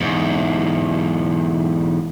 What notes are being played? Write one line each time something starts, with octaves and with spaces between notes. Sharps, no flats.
E2 G#2